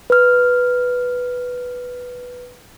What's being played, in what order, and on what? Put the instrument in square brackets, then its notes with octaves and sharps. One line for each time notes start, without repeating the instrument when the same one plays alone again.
[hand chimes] B4 F6